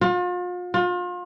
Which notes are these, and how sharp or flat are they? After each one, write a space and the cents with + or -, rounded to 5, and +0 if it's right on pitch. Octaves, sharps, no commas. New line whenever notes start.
F4 +40
F4 +35